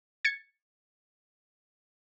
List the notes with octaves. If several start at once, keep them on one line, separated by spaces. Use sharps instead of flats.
G#6 A6 C#7